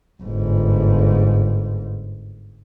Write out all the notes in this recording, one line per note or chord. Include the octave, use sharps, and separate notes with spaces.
G1 G#2